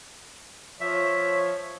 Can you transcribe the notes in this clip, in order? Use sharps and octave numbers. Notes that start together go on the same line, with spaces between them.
F3 C#5 E5